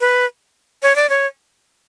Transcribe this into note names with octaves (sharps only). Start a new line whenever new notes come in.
B4
C#5
D5
C#5